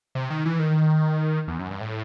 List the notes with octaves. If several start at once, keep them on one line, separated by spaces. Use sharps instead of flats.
C3
D#3
E3
D#3
E2
F#2
G2
A2